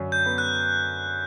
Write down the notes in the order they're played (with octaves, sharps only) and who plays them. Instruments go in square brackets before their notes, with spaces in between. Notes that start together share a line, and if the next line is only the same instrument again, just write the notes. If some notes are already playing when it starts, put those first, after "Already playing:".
Already playing: [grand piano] F#2 D3 F#3
[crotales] G6
[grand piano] B3
[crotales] F#6